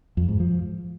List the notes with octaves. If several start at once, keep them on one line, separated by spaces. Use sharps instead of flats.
F2
G#2
F3